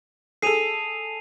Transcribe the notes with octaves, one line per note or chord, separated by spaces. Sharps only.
G#4 A4 C7 D#7 F7